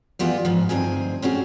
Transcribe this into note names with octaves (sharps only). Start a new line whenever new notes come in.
E3 G3 B3 F4 F#4 G#4
G#2 E3 F3
D2 G2 C4 D#4 G#4 G#5
C4 C#4 F#4 G#4